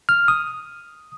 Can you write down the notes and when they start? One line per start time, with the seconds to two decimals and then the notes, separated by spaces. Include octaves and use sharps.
0.09 F6
0.28 D#6